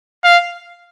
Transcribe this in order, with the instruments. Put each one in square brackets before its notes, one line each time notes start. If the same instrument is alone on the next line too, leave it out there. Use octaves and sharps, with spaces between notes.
[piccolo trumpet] F5